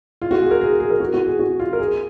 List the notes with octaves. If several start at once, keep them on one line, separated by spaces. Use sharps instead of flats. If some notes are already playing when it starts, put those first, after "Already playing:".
F4
F#4
G#4
A#4
G#4
G#4
A#4
F#4
F#4
G#4
F#4
F4
A#4
G#4